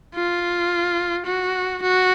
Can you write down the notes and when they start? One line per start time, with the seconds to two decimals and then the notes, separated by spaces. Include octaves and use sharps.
0.15 F4
1.26 F#4
1.82 F#4